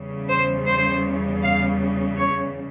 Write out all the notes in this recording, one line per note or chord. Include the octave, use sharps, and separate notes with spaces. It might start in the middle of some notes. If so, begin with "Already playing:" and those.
Already playing: E2 C#3 G3
C5
C5
F5
C#5